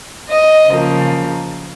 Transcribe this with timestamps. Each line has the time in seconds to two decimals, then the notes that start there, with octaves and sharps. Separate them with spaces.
0.28 D#5
0.69 C#3 F3 A#3